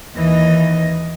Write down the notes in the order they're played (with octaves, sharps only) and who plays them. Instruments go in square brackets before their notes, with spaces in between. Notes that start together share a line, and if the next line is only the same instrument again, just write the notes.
[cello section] D#2 E3 D#5